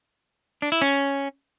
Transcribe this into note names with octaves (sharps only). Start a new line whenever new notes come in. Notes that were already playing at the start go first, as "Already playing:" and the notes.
D4
E4
C#4